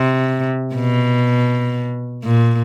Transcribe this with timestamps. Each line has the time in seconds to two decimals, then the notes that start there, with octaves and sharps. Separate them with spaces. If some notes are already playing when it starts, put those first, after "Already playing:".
Already playing: C3
0.75 B2
2.24 A#2